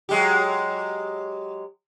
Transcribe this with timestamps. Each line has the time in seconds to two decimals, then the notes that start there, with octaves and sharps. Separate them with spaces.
0.09 F#3 G#3 G4